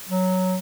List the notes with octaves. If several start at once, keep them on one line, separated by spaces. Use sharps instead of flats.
F#3